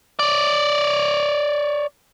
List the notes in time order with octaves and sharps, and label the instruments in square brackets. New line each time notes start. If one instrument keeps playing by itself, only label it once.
[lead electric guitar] C#5 D5